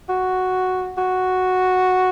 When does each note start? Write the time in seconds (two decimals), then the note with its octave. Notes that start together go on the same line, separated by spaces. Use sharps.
0.09 F#4
0.98 F#4